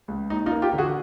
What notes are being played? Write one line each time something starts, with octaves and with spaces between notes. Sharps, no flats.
C#2
D#2 D#4
D#4 F4
A#3
F4 G4
D3
F#4 G#4